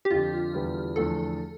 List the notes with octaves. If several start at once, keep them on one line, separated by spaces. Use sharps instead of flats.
G4
F2 D3 F3 F4
E2 D3 G3 B3 E4
E2 D3 F3 A3 A4